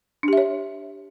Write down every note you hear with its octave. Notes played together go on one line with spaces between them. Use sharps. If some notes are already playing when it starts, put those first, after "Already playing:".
D4 G4 C#5 E5